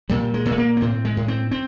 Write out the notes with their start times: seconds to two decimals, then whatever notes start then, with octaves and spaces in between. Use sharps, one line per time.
0.09 A#2 G3
0.34 G#3
0.46 A#2
0.52 A3
0.58 A#3
0.77 B3
0.81 A2 C4
1.05 G#3
1.17 A2
1.28 C4
1.51 C4